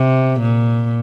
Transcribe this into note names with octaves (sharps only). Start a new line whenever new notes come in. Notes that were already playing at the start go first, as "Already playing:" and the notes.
Already playing: C3
A#2